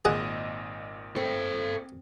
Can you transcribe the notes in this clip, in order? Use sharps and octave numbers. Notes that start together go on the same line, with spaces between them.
G#1 A#2 G#4 D#5 F#5
C4 A4 G5